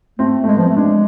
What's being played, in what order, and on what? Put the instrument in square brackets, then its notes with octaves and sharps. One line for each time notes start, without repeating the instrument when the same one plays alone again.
[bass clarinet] A3 [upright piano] C4
[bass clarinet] G#3 [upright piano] A3
[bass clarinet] F3 [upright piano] B3
[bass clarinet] A3 [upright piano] C4
[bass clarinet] G#3 [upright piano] D4